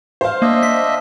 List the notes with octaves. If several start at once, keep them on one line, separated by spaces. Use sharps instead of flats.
C5 F5
A#3 D4 D#5 E5
B6